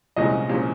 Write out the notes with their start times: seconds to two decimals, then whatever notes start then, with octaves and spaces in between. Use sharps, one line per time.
0.16 C2 A#2 F3 G#3 C#4 D#5
0.49 A#2 F3 G#3 C#4